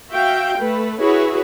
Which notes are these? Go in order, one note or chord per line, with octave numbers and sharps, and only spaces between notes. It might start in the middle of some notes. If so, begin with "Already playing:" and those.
F#4 E5 F5 G5
A3 B4
E4 F#4 G#4 B4 C#5